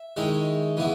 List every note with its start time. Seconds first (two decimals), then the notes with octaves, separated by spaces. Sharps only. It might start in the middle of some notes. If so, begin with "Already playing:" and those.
Already playing: E5
0.17 D#3 G#3 C#4 E4
0.77 C#3 E3 B3 E4